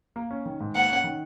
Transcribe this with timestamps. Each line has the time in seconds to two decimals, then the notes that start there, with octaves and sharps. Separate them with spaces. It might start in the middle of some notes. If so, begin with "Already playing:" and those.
0.16 A#3
0.31 C#4
0.46 D#3
0.60 G#2
0.75 A#3 F#5
0.90 C#4
1.04 D#3